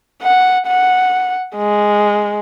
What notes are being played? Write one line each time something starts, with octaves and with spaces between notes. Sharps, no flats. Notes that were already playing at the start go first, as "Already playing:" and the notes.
F#5
F#5
G#3